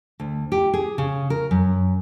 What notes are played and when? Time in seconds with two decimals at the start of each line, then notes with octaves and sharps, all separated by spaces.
0.20 D2
0.52 G4
0.74 G#4
0.98 C#3
1.30 A#4
1.51 F#2